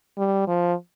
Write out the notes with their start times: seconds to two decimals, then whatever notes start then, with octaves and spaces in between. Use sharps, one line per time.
0.18 G3
0.48 F3